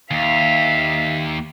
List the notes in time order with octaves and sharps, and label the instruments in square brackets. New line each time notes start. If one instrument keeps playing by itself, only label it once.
[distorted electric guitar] D#2 [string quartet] E5 F5